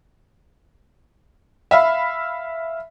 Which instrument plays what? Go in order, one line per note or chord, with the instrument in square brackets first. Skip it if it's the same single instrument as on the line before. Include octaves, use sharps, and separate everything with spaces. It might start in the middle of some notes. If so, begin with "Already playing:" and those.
[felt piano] E5 F5 B5